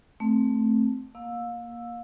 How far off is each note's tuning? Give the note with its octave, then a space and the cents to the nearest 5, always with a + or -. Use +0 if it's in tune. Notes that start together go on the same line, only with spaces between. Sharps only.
A3 +0 C4 +5
A#3 +5 F5 +30 E6 +0